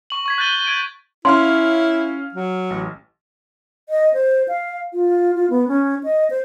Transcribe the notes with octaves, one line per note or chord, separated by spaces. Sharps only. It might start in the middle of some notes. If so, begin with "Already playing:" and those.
C#6 F#7
C#6 G#6 B6
F#6 G6 A6 D#7 G7
G7
G6 G#6 D7
C#4 E4 F5 C6 F6
F#3
A1
D#5
C5
F5
F4
F4
B3
C#4
D#5
C5